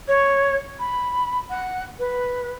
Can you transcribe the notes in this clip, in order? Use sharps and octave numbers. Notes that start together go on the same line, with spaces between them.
C#5
B5
F#5
B4